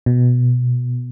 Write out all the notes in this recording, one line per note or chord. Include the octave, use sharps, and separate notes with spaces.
B2